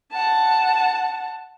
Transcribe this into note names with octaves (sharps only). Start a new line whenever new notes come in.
F#5 A5